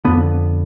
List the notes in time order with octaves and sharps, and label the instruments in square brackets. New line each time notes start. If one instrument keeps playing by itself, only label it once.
[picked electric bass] F2 D3 B3